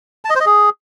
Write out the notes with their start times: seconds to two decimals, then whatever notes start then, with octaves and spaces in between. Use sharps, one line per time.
0.25 A5
0.30 D#5
0.35 C5
0.40 D#5
0.46 G#4